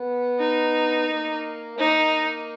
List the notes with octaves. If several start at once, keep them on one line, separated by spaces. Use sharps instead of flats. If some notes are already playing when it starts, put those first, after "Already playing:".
Already playing: B3
D#4
A#3
A#3 D#4